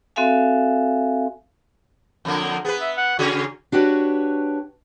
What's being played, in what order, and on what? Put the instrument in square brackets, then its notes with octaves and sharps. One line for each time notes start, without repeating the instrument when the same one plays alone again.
[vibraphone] C4 F#4 A4 E5 F5 G#5
[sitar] F2 D3 A#3
[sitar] B3 B4 [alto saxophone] G#4
[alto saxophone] E5
F#5
[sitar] C#3 C#4 G#4 [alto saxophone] F#4
[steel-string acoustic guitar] D4 F#4 G4 B4 C#5